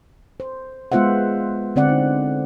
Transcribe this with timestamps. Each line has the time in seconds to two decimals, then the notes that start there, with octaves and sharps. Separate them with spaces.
0.40 C5
0.92 G#3 B3 F4 C5 E5 F#5
1.76 D3 C4 D5 F#5
1.89 D#4